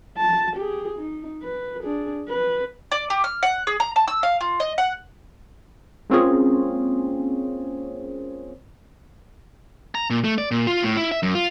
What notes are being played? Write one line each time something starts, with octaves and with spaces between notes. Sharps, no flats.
A5
G4 G#4
D#4
B4
D4 G#4
B4
D5
G4
F6
F#5
G#4
A#5
A5
E6
F5
F4
D#5
F#5
G#3 A#3 C4 C#4 F4 G#4
A#5
A#2
A3
D5
A#2
F4
A2
E4
E5
F#2
F4